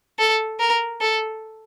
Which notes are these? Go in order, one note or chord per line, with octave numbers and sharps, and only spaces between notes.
A4
A#4
A4